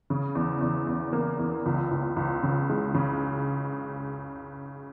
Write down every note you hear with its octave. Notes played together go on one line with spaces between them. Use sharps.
C#3
E2
E2
E2
A#3
E2
C#2
C#2
C#2
C#3
G#3
C#3